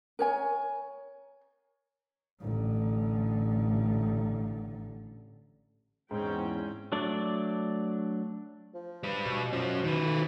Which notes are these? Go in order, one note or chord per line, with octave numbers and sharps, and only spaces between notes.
A#4 C#5 G#5
A1 D3
E2 G#2 C4 C#4 G5
F#3 A3 D4 D5
F3
G3 B4
B2
F#2 F3 C#4
D#3 B4
A2